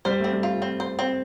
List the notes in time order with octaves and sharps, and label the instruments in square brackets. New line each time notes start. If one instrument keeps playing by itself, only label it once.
[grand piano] G3 [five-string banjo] C5
[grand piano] A3 [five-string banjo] C4
[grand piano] G3
[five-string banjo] F4
C4
C5
C4